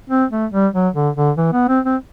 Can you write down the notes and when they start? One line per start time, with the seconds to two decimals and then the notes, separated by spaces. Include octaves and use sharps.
0.10 C4
0.31 A3
0.53 G3
0.74 F#3
0.95 D3
1.16 D3
1.37 E3
1.53 B3
1.69 C4
1.85 C4